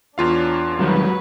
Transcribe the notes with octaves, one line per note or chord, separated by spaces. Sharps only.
E2 D4 F4 C#5 F5
G#2 D#3 F#3 G3 B4 C#5